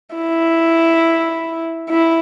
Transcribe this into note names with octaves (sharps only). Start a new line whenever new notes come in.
E4
E4